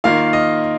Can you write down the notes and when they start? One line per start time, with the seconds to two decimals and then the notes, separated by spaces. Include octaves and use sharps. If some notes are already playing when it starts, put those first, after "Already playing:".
0.04 D#3 A#3 F4 F5
0.33 D#5